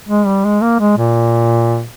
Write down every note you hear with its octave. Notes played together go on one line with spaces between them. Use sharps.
G#3
G3
G#3
A#3
G#3
A#2